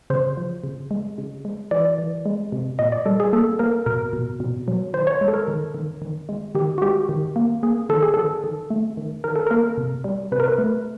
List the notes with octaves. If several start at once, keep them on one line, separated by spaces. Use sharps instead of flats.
C#3 C5
F3
C#3
G#3
C#3
G#3
E3 D5
E3
G#3
C3
A#2 D#5
D5
G3 A4
G#4
A#3 A4
A#3 A#4
B2 A#4
B2
B2
F#3
D#3 C5
C#5
G#3
A4
A#4
D#3
D#3
D#3
G#3
D#3 G4
F#4
G#3 G4
D#3
A#3
A#3 G#4
D#3 A4
G#4
D#3 A4
D#3
A3
D#3
D#3 A#4
A4
A#3 A#4
C3
G3
C3 B4
A#4
B4
A3